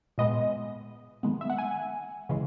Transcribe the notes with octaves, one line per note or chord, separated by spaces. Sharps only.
A#2 G#3 B3 D#5
D#3 G#3 B3
E5
F#5
G#5
C#3 E3 G#3